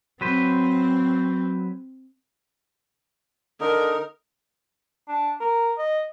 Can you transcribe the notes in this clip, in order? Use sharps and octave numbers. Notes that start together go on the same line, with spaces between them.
F#3 C4 B4 C5
D3 D#4 A#4
D4
A#4
D#5